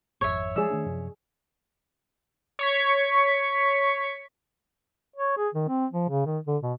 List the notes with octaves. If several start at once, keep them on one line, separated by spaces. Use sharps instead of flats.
G#1 F2 C#5 E5
F3 G3 G#3 G#4 D5 E6
D#3 A3 D4
F#2 C3 F3
C#5 C#6 B6
C#5
G#4
D#3
C4
F3
C#3
D#3
D3
B2